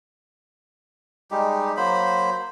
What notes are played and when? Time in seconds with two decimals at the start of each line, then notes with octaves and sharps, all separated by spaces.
1.31 G3 G#3 D#4 G4
1.77 F#3 A#3 C5 B5